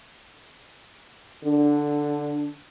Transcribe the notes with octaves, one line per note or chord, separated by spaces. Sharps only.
D3 D4